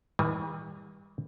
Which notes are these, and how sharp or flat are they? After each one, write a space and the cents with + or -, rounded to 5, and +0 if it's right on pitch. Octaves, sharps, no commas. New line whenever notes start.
E3 -45 G3 +30 G#5 +0